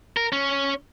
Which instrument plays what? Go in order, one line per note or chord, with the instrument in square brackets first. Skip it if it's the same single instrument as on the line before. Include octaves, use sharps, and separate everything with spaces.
[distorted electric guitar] A#4
C#4